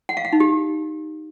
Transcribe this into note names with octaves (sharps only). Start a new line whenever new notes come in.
F#5
F5
F#5
D#4
G4